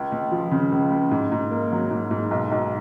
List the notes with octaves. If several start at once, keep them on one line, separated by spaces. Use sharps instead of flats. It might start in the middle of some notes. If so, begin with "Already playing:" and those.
Already playing: C#2
C#2
F3
C#3
C#2
C#2
G#2
G#2
A#3
F#3
G#2
G#2
B1
B1